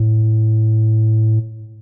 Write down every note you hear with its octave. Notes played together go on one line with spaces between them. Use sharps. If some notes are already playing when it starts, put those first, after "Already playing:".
Already playing: A2